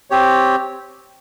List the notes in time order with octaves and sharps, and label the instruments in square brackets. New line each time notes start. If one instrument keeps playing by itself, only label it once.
[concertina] C4 G4 C#5